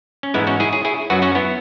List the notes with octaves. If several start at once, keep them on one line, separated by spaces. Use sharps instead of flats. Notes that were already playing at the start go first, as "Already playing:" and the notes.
C#4
G#2 E3 G#3 B3 E4
C#4 F#4
E4 G#4
G#4 C#5
E4 G#4
F#2 F#3 F#4 B4
C#4 F#4
B3 E4